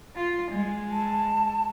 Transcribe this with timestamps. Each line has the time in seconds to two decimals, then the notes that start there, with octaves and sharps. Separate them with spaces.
0.16 F4
0.51 G#3
0.91 A5